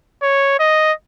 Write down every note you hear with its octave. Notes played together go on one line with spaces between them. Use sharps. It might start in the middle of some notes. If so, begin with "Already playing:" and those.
C#5
D#5